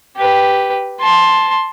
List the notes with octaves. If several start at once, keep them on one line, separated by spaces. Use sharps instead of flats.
G4 B4
A5 C6